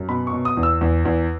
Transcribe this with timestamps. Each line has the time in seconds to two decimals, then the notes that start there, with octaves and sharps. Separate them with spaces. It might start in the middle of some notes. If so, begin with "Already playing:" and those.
Already playing: F#2
0.09 B2 B5
0.27 C#6
0.33 B2
0.45 D#6
0.57 E2
0.63 E6
0.81 E2
1.05 E2